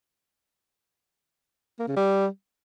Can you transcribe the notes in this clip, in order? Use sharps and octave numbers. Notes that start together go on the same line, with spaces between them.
A#3
C#3
G3